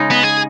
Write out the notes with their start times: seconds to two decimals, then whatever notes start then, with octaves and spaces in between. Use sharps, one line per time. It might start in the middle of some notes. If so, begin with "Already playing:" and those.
Already playing: C#3 G#3 D#4
0.11 B3
0.23 G#4